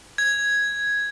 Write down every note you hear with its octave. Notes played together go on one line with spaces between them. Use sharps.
G#6